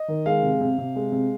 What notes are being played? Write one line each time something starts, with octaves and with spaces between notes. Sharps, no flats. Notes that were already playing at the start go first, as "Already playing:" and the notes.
Already playing: D#5
D#3
G#3 F5
C3
C3
C3
G#3
C3